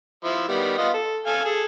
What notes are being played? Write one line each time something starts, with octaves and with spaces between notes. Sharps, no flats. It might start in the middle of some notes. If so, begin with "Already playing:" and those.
F3 E4
D#3 G3 B3
B3 F4 D#5
A4
A4 F5 G#5
G#4 A4